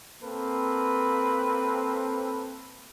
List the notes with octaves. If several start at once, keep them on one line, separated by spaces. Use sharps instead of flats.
A#3 C4 A4 B4